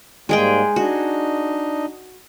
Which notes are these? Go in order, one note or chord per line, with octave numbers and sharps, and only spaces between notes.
G#2 G3 G#3 A#3 G#4 G5
D4 D#4 F#4 D#5